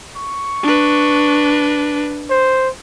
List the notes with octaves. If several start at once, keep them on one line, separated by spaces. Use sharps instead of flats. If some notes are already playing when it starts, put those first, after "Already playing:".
C#6
D4 B4
C5